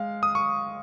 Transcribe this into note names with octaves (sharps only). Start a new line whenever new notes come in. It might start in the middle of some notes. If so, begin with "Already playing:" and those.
Already playing: G#3 F5
D#6
C#6